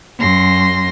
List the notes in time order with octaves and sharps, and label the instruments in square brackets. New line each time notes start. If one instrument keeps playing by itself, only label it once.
[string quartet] F#2 C6 A#6